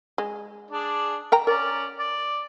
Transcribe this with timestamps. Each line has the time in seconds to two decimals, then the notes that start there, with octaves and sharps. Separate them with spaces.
0.18 G#3
0.71 D4 G#4 D5
1.32 A#4 G5 A#5
1.47 C#4 A#4 D5
1.99 D5